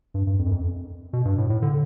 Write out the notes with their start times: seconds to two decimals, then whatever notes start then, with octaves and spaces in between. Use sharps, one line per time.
0.14 G2
0.27 G2
0.39 F2
0.46 F#2
0.51 F2
1.13 B2
1.25 G2
1.38 A2
1.50 A2
1.62 D3